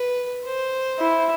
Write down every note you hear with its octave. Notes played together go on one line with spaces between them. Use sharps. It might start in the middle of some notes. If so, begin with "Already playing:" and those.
Already playing: B4
C5
E4